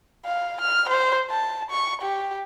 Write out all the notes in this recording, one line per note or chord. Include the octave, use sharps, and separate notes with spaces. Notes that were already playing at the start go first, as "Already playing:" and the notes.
F5
F6
C5
A5
C#6
G4